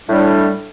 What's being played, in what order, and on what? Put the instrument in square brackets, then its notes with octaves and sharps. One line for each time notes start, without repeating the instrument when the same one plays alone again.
[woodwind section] A2 G3 D4